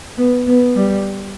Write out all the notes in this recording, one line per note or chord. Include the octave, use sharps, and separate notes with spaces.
B3
B3
G3